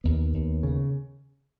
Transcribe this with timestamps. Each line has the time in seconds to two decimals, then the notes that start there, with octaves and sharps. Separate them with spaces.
0.04 D#2 B3
0.34 D#2
0.63 C#3